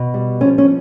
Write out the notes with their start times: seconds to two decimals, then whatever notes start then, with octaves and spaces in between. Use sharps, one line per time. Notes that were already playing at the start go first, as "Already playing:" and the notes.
Already playing: B2
0.14 G3
0.41 F3 C#4
0.58 C#4